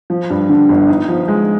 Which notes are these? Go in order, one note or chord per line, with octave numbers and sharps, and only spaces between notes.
F3
G2
D3
G1
D#4
F3
G#3